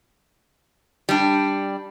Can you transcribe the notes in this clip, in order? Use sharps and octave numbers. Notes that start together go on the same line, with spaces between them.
G3 D4